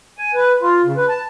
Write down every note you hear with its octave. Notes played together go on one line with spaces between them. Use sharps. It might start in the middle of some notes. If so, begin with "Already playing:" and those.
G#5
B4
F4
C#3
B4
A5